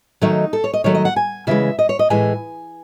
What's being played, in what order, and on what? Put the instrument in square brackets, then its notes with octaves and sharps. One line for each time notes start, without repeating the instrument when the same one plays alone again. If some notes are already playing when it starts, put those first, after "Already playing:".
[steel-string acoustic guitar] D#3 F#3 A3 D#4
A4
C#5
D#5
D#3 F#3 A3 C#5
D#5
F#5
G#5
C#3 E3 G#3 E5
D#5
C#5
D#5
A2 E3 G#3 G#5